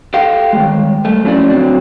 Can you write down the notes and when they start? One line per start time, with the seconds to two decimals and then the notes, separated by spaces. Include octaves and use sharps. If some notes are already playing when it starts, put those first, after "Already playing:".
0.14 G4 A4 F5 G5
0.53 D#3 G3 G#3
1.05 G3 A3
1.24 F3 F#3 A3 C#4 E4 D5
1.48 D3 F#3 C4